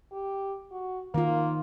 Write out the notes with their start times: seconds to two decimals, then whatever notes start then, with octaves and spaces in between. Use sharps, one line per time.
0.12 G4
0.71 F#4
1.14 D#3 A#3 F4